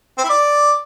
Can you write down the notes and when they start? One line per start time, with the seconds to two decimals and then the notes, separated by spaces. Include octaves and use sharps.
0.18 C4
0.24 E4
0.29 D5